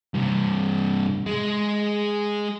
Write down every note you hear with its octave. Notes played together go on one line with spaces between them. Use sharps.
G2 C3
G#3